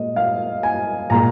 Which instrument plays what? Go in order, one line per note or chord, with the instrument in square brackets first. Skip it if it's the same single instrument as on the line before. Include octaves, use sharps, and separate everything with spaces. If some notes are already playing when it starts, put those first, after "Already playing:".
Already playing: [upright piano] A#2 G#3 D#5
F5
G#5
A#2 G#3 A#5